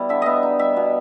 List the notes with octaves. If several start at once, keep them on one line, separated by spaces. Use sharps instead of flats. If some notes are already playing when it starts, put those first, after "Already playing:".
Already playing: B2 G3 E4
D3 E5
B3 D#5 E5
D#4
G3 E5
B2